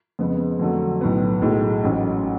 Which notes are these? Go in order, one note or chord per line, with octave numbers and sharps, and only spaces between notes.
F2 C#3 G#3 B3
F2 D3 F#3 A3
B1 A2 F#3 B3
B1 A2 G#3
A1 G#2 F#3 C#4